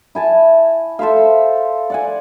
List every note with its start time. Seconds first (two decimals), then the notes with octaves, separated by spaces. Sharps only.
0.15 E4 G#5 A5
0.99 A4 C5 E5 F5
1.90 D5 F#5 G#5